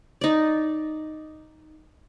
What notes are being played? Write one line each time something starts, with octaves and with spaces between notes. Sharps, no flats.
D#4 D5